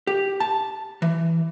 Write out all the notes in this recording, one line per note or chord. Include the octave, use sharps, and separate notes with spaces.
G4
A5
E3